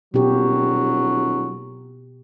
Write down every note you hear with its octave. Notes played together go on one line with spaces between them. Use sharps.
D#1 B2 F#3 G4